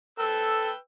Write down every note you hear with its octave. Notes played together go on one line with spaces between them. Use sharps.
A4 B4 G5 E6